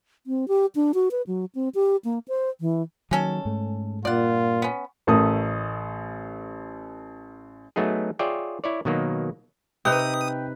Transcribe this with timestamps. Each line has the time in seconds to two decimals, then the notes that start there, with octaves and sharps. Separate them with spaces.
0.27 C4
0.48 G4
0.75 D4
0.94 F#4
1.11 B4
1.27 F#3
1.55 C4
1.75 G4
2.05 A#3
2.28 C5
2.61 E3
3.11 D#3 F#3 G#3 A#3 C#4 A4
3.45 G#2 A3
4.05 G2 A#2 F4 D5 F#5
4.62 B3 C#4
5.07 A1 A3 A4 A#4 D#6
7.76 F#3 A3 B3 D#4 G#4
8.19 F4 G#4 C#5 D5 E5 G5
8.64 E4 C#5 D5
8.85 B2 D#3 F#3 A#3
9.85 C3 D#4 B4 G5 D#6 G6